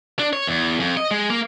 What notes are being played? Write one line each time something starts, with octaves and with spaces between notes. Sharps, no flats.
D4
C#5
E2
F2
D#5
G#3
A#3